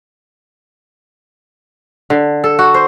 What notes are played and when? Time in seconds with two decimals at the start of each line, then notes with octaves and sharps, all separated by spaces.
2.10 D3
2.44 A4
2.59 F#4
2.74 C5